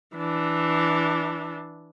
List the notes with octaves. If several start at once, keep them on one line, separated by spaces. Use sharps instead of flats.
E3 D4